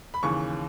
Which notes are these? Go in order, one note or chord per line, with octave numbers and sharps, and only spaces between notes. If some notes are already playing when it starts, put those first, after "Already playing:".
B5
D#2 C#3 E3 C#6